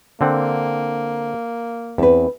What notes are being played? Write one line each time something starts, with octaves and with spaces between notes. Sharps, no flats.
D3 A#3 C4 F#5
E2 C4 B4